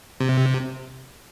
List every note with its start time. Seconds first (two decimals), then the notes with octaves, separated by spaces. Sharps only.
0.20 C3